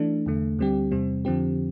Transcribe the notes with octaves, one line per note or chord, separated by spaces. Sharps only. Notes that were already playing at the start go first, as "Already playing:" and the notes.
Already playing: E3 A3 D4
E2 D3 A3
D2 D3 G3 C4 G4
E2 C3 G3 C4
F2 D3 F3 C4 G4